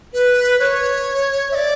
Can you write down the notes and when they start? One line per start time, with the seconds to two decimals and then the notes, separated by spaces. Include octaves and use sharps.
0.13 B4
0.59 C#5
1.51 E5
1.55 D5